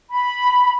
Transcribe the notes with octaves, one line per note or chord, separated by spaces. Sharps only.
B5